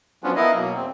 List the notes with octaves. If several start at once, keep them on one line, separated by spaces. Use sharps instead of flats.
F3 F#3 B3 C#4 D4 F4
B3 E4 A#4 D#5 F5
B2 F#3 A#3
E2 C4